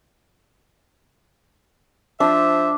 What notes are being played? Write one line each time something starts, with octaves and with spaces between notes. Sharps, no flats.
F3 D4 C5 E5